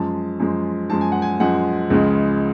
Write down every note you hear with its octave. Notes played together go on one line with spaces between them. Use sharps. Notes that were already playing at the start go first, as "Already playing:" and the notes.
Already playing: F#2 F3 G#3 A5
F#2 F3 G#3
F#2 F3 G#3 A5
G#5
F#5
G#5
F#2 F3 G#3 F#5
C#2 C#3 F3 G#3